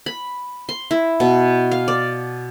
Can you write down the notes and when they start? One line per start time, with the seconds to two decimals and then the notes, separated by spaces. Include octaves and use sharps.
0.06 B5
0.69 C6
0.91 E4
1.20 B2
1.71 F5
1.88 D5